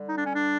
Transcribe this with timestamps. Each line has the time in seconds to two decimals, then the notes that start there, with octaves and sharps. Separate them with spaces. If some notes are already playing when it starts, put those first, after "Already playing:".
Already playing: D3 G3
0.09 D#4
0.18 D4
0.26 C#4
0.35 D4